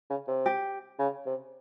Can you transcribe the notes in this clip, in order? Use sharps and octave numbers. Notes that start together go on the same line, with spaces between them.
C#3
C3
G4
C#3
C3